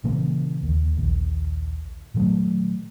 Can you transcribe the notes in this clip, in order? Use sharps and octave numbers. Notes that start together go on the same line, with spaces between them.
A#2 C#3 E3 A#3
D#2
A#1 D#2
A#2 D#3 F#3 A3